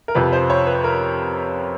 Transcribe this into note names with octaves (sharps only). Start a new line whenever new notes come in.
A#4
F2 C3 F3 B4
C5
C#5
B4
A#4